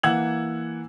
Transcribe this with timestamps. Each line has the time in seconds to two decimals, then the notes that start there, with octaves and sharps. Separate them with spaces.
0.03 E3 A#3 F#5 E6 G#6 F#7